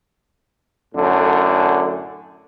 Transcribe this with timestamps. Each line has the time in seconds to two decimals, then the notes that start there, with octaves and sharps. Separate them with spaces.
0.95 F#2 A2 D3